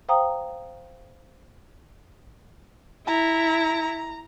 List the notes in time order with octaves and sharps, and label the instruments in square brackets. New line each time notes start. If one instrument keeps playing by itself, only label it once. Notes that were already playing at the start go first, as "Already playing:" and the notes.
[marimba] C5 F5 G5 A#5 D#6
[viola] E4 [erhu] A#5